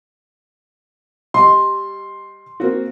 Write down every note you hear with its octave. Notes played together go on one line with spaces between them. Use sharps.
G3 D#5 C6
A#3 C4 F#4